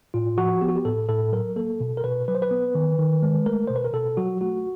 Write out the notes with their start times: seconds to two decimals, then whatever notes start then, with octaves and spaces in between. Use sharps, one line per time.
0.14 A2 F4
0.38 F3 F#4
0.61 B3 G4
0.69 F#4
0.76 G4
0.85 A2 A4
1.09 A2 A4
1.32 F#3 A#4
1.56 A#3 A4
1.80 B2
1.97 A#4
2.04 B2 B4
2.28 F#3 B4
2.35 C5
2.42 B4
2.51 B3
2.75 D#3
2.98 D#3
3.22 G#3
3.46 A3 A#4
3.67 B2 C5
3.76 B4
3.84 A#4
3.93 B2 A4
4.17 F#3 F#4
4.41 A3 F#4